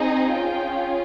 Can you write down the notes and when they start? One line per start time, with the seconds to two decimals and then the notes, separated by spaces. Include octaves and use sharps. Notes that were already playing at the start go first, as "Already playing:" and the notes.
Already playing: C4 D#4 G#4 D#5
0.32 C#4 F4 G#4 G5